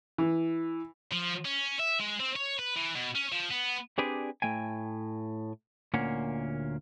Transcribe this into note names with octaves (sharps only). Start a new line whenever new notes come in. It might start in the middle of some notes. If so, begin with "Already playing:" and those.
E3
F3
C#4
E5
G#3
C4
C#5
B4
E3
B2
C#4
F3
B3
C4 D4 G4 G#4 B4 D5
A2 A3 G5 G#5
D2 A#2 A#3 C#4 F#5